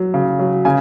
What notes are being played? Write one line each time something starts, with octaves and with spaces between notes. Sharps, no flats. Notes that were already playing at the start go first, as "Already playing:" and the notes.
Already playing: F#3
C#3
F#3
C#3 G#5